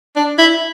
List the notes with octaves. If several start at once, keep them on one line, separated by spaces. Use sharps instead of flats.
D4
E4